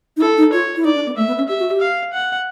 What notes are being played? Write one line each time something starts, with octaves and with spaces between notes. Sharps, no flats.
D#4
E4 A4
D#4
F4 C#5
E4
D#4 D5
D4
B3
A3 E5
B3
C#4
G4 E5
F#4
G4
F5
F#5